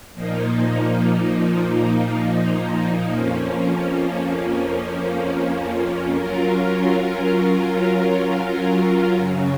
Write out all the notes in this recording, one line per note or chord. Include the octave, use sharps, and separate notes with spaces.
A#2 F3 A#3 D#4
F2 F3 A#3 C#4
F#3 C#4 F4 A#4
F#2 C#3 F#3 C#4